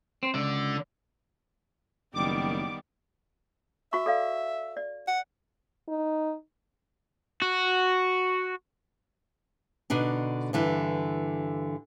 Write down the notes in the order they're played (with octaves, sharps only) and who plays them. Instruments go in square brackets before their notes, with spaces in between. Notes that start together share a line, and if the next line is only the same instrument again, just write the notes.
[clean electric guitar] C4
[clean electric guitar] C#2 [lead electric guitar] D3 D5
[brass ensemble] F#1 [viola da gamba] D#3 G3 B3 [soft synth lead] D6
[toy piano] F#4 C#6 [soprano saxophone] E5
[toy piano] A4 D5 F5
D5
[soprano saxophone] F#5
[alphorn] D#4
[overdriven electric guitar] F#4
[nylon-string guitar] B2 D3 D4 D#4
G2 D3 E3